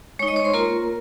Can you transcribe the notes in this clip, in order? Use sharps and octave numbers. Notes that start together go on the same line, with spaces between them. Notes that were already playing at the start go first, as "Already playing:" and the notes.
G#3 D#4 C#5 C#6
D#5 D#6
C#5 C#6
C5 C6
A#3 F4 A#4 A#5